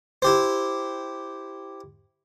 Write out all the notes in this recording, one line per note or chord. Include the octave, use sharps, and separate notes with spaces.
E4 G4 C5